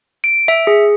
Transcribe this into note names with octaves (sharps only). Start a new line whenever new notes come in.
D7
E5
G#4